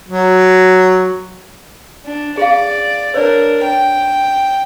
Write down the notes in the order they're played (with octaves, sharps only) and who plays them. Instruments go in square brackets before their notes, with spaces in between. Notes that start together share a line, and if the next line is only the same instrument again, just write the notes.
[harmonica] F#3
[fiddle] D4
[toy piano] G#4 F5 [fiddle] D5
[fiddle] D4 A#4 [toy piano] B4 C#5 D5
[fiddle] G5